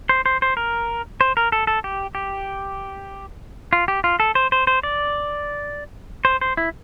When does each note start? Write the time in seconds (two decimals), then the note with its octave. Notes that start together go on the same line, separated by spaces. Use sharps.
0.09 C5
0.26 C5
0.42 C5
0.57 A#4
1.21 C5
1.37 A#4
1.52 A4
1.67 A4
1.84 G4
2.15 G4
3.73 F4
3.88 G4
4.04 F4
4.20 A4
4.35 C5
4.52 C5
4.67 C5
4.83 D5
6.25 C5
6.41 C5
6.57 E4